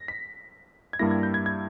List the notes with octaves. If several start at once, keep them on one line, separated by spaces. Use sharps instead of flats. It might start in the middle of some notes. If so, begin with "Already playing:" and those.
Already playing: A#6
B6
G#6
G2 G3 A#3 E4 A#6
G#6
G6
G#6
G#6